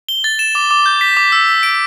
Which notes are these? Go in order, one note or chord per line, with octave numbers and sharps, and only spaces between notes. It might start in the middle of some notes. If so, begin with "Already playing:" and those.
G7
A6
E7
D6
D6
G6
B6
D6
E6
B6
D7